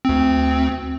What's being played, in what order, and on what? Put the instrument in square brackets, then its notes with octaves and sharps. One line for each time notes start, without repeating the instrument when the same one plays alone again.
[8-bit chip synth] D2 C4